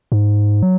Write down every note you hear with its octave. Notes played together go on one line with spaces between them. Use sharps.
G#2
F#3